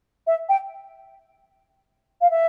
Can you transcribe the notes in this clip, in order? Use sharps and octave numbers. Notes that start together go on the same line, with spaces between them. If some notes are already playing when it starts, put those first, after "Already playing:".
E5
G5
F5
E5